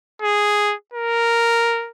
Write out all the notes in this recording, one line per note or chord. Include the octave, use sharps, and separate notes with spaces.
G#4
A#4